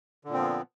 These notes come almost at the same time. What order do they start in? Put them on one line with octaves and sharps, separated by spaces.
D3 A#2 C4 F3 B3